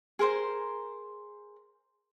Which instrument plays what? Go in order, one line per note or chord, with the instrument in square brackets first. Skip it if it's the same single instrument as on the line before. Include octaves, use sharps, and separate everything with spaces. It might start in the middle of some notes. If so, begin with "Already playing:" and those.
[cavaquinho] G#4 A#4 C5 C6